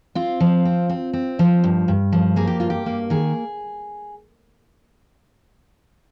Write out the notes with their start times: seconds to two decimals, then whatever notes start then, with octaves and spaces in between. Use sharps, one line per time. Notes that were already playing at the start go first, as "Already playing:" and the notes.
0.15 C4 F4
0.40 F3
0.65 C4
0.89 C4
1.13 C4
1.39 F3
1.64 G2
1.88 G2
2.12 F3
2.36 A#3 G#4
2.47 G4
2.60 G2 F4
2.70 G4
2.86 A#3
3.10 D#3 G#4